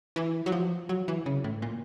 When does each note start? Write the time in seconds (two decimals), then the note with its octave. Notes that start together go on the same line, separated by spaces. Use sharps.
0.16 E3
0.46 F#3
0.52 F3
0.89 F#3
1.08 E3
1.26 C#3
1.44 A2
1.62 A#2